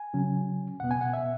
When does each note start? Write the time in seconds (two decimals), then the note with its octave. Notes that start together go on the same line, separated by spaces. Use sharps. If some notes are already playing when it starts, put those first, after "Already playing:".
Already playing: G#5
0.14 C#3 F#3 C#4
0.80 E2 B2 B3 F#5
0.91 G#5
1.01 F#5
1.13 E5